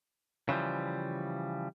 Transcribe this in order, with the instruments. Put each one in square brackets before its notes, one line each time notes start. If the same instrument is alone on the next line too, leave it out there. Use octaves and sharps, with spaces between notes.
[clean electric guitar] C#3 E3 F3 G3